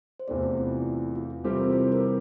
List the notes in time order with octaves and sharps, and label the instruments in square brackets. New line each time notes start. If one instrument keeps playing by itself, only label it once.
[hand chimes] C5
[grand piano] E2 C3 E3 A3 [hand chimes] D5
[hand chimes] F4
E4
F4
F4
[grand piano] C3 E3 G3 C4 G4 [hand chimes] A4
[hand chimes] A#4
C5
A#4